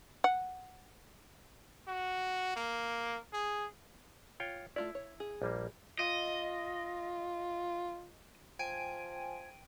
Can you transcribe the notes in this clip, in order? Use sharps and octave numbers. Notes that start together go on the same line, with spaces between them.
F#5
F#4
A#3
G#4
F4 C#5 G5
A3 E4 F4 D5
C#5
G#4
A#1 G3 A#3
F4 D#5
F3 G5 G#5 D7 D#7